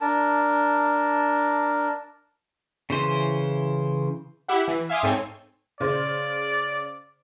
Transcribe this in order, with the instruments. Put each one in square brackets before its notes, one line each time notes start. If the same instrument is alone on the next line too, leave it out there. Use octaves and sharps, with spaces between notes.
[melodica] D4 A#4 A5
[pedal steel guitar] C#3 E3 C5
[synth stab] E4 G4 E5 F#5
E3
E5 F5 G#5 C6 D6 D#6
G#2 C4 A4 C#5 G#5 C6
[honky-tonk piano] C#3 C5 [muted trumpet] D5